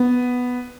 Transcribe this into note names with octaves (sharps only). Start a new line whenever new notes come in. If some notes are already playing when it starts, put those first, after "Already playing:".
Already playing: B3